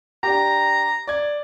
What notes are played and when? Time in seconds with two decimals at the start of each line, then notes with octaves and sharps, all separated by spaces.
0.23 D4 G4 A#5
1.07 D5 G#6